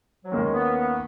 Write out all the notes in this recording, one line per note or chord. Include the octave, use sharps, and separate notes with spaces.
F#3
D#2 D#3 G#3 A#3 C#4
B3
B3